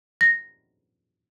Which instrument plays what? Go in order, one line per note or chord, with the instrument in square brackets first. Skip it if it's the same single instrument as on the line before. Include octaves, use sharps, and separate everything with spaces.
[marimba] A#6